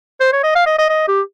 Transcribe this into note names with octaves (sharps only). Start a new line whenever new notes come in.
C5
C#5
D#5
F5
D#5
D#5
D#5
G4